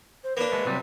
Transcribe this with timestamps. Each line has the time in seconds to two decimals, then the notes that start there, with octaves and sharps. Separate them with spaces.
0.24 C5
0.37 A#3 D4 B4
0.52 G#3 A3
0.66 C3 F#3 G3